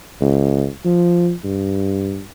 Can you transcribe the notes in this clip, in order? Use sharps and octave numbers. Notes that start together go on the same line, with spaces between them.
C#2
F3
G2